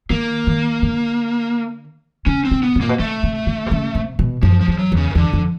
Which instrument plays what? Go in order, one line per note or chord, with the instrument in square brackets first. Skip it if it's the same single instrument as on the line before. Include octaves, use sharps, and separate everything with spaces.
[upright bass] D#3 [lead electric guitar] A#3
[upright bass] D#3
D3
[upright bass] C#3 [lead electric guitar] C#4
[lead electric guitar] C4
[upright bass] C3
[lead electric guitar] B3
[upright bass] B2
[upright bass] A#2 [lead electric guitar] A#3
[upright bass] B2
[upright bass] C3 [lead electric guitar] A3
[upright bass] C3
D3
C3
C#3
C3
B2
[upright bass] F#2 [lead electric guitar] F3
[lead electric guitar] F3
[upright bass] E2
[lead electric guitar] F#3
[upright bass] E2 [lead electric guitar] C#3
[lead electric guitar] D#3
[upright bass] E2 [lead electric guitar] D3
[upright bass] F2